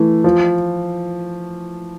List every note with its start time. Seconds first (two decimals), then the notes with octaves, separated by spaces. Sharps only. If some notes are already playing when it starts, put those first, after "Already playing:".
Already playing: E3 A3
0.24 F3